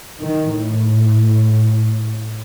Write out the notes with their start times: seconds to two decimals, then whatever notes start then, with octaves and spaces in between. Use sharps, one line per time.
0.21 D#3
0.55 A2